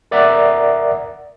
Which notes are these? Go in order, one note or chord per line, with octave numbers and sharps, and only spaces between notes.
A#4 D5 E5 F#5 A#5